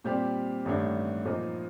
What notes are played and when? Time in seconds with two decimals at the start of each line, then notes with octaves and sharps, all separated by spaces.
0.04 A#2 G3 C4 G4 D5
0.65 A1 G2 D#3 A3 D4
1.25 A#2 F3 A#3 D#4